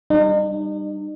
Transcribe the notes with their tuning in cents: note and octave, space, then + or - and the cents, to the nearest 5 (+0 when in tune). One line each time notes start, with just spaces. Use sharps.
G3 +0 D#4 -40